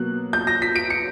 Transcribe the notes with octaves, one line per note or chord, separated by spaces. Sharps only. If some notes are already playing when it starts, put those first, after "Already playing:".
Already playing: B2 F#3 A#3 F#6
G6
A#6
B6
D7
C#7